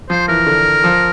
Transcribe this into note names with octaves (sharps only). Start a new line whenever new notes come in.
F3 C5
E3 A#4
D3
F3